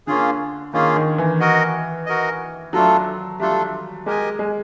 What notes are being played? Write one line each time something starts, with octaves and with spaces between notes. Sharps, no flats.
D3 A#3 C#4 F4 G#4
D#3 A#3 C#4 F4 G#4
D#3
E3
F#4 A#4 D#5
F#4 A#4 D#5
F#3 A3 D4 F4 A4
G3 A3 D4 F4 A4
G#3 G4 A#4 D#5 G#5
G#3